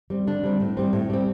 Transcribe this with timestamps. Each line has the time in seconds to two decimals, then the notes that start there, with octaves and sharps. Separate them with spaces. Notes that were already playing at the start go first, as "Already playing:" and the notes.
0.10 G3 C4
0.27 D3 D4
0.44 G3 C4
0.60 A2
0.77 G3 C4
0.93 A2
1.10 G3 C4